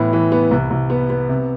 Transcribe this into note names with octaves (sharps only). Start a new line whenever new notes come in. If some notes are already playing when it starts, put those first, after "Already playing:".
Already playing: A2 E3 B3
E3
B3
C2
C2
B3
B3
C3